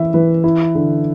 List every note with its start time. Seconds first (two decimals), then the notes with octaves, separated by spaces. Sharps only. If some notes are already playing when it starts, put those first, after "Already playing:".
Already playing: E3 E4 E5
0.14 E3 B4
0.44 E4
0.75 D3